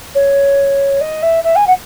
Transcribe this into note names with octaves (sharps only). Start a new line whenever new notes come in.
C#5
D#5
E5
E5
G#5
F#5